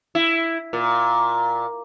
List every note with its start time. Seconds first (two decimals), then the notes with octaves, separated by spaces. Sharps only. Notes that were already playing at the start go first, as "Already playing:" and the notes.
0.15 E4
0.73 A#2